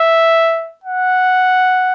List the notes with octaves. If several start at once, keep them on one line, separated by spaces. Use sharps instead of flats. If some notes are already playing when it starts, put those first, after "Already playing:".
Already playing: E5
F#5